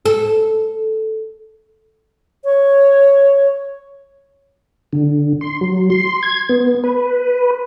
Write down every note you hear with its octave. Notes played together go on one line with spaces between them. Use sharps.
A4
C#5
D3
C6
F#3
C6
G#6
B3
B4